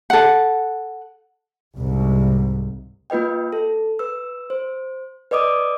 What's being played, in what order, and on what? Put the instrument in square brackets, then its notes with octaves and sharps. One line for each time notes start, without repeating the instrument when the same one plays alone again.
[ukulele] A4 F#5
[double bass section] C2 G#2
[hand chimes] A#3 F4 B4 D#5 G5
A4
B4 E6
C5
B4 D5 D#5 D6 D#6